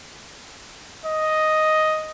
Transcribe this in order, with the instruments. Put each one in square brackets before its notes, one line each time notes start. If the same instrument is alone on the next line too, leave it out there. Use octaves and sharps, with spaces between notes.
[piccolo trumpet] D#5